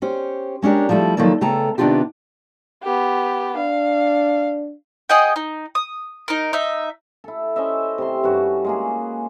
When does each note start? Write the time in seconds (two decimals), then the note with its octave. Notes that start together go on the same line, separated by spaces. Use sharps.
0.02 C#4 G4 C5
0.62 G#3 C#4 D4 G4 A#4
0.89 F3 G3 A3 E4
1.17 D#3 F3 F#3 A#3 A4
1.41 C#3 A3 B3 A4 G5 A#5
1.78 C3 D#3 B3 D4 F4 G4
2.83 B3 G4
3.57 D4 F5
5.09 G#4 D#5 F#5 G5
5.36 D#4
5.75 D#6
6.28 D#4 A#4
6.53 D#4 E5
7.24 E4 A4
7.56 C#4 C5 D#5 E5
7.98 C3 E4 C6
8.24 G2 C#4 F#4
8.65 G#3 A#3 G#4